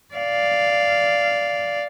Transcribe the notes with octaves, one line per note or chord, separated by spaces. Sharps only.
D5 F5